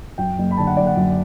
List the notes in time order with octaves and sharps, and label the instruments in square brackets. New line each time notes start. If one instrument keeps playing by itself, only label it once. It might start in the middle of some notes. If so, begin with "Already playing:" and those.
[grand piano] F#2 G5
F#1
B5
D3 A5
F#5
F#1 D5
F#5
F#2